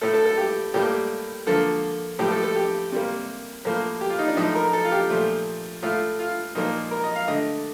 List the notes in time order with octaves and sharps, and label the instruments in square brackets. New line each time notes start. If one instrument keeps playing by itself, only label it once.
[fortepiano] A2 A3 A4
A4
A4
G4
A2 G3 A#3 G4
D3 F3 A#3 A4
A2 F3 A3 G4
A4
A4
G4
C3 G3 A#3
A2 F3 A#3
G4
F4
D#4
D4
A2 F3 A3 D#4
A#4
A4
F4
G4
A#2 F3 A3
A2 A3 F4
F4
A#2 F3 A#3 D#4
A#4
D#5
F5
D3 A3 D#5